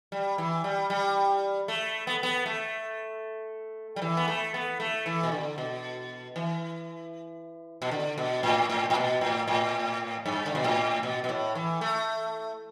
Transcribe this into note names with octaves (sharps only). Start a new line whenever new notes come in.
G3
E3
G3
G3
A3
B3
B3
A3
G3
E3
B3
A3
B3
A3
E3
B2
D3
B2
E3
B2
D3
B2
A2
A2
A2
B2
A2
A2
G2
D3
B2
A2
B2
B2
A2
E3
A3